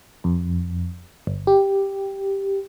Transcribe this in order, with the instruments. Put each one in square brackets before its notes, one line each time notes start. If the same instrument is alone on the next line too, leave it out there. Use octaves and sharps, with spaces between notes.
[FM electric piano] F2
G1
G4